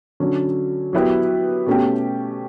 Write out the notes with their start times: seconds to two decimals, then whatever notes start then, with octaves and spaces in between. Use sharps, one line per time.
0.20 D3 F#3 C#4
0.93 F#3 B3 E4 G4 B4
1.66 B2 A3 C#4 G4